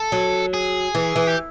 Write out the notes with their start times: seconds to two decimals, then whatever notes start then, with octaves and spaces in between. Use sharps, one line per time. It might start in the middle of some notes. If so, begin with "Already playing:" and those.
Already playing: A4
0.12 F#3
0.54 G#4
0.95 E3
1.16 E3
1.27 G4